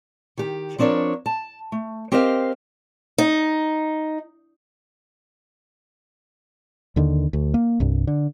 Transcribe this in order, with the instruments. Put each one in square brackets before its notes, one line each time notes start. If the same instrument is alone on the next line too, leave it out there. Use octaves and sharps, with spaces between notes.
[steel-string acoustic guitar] D#3 G4
F3 C4 D4 A#4 C#5
A5
A3
C4 G4 A#4 C5 D#5 F5
D#4
[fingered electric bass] D#2 D3 D#3
D2
A#3
C2 G2
D3